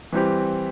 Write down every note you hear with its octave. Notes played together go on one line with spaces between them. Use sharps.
E3 G3 C4 G4